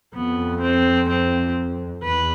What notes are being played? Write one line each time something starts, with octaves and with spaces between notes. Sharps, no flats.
F2 B3
C4
C4
E2 B4